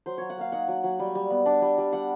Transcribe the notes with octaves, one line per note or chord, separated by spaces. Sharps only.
F#3 C5
F#3 C#5
F#5
A#3 F5
D#4 F#5
F#3
F#3
G3
G3
B3
D4
G3
G3
G3 F#5